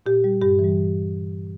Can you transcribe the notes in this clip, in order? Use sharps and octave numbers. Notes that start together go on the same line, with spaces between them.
A#2 G4
G3
G2 G4
E3 G3